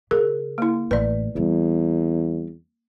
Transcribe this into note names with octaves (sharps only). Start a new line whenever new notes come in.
C#3 G#4 A#4
A#3 E4
A1 B4 D5
E2 G3 C4